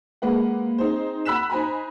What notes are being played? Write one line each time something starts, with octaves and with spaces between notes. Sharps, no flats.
G#3 A#3 B4 F#5
C4 D#4 G#4 C5
F#5 B5 E6 F#6 B6 E7
D#4 C5 G#5 A#5 B5